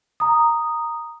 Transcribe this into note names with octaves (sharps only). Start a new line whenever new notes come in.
A#5 D#6